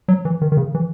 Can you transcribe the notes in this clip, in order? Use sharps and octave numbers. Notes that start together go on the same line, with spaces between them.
F#3
E3
D#3
D#3
C#3
E3